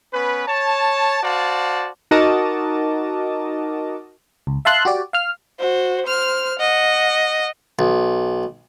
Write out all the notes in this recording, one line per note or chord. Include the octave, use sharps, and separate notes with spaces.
B3 C#4 B4
C#5 A5
F#4 C5 D5 F5 A5
D#4 F#4 A#4 D#5 A5 D6
C#2
E5 F5 A5 C6 F#6
F#4 G4 D5
F5 F6
F#4 C5
C5 F6
D#5 F#5
B1